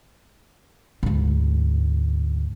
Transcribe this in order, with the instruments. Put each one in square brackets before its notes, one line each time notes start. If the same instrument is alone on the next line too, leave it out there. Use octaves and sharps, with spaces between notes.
[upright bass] D2 G#2